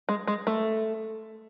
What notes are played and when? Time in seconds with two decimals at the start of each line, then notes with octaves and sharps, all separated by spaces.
0.09 G#3
0.27 G#3
0.47 A3